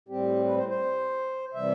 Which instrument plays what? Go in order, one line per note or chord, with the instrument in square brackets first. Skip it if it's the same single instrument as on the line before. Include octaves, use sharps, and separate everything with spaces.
[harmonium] A2 G3 C4 G4
B4
C5
C5
C3 E3 G3 E5